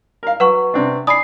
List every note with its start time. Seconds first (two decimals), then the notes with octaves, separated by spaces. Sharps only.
0.23 A#4 F5
0.40 F#3 B4 F#5 C#6
0.74 C3 C4 D4
1.07 D5 G#5 B5 D#6 C7